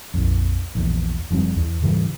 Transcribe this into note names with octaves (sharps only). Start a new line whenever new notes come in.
A#1 F2
A#1 E2
F#1 F3 G3 C4
E2
G#2 C#3 E3 G3